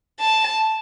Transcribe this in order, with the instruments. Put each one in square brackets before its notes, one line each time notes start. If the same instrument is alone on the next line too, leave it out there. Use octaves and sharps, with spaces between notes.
[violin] A5